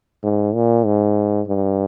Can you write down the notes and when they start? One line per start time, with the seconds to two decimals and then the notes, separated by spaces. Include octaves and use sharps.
0.23 G#2
0.54 A#2
0.85 G#2
1.47 G2